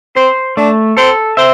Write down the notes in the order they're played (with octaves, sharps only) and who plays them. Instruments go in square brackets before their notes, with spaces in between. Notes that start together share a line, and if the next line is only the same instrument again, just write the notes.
[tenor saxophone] C4 [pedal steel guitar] C5
[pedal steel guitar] A3 [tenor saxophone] D4
[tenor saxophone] C4 [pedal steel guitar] A4
[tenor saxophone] C4 [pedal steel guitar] E5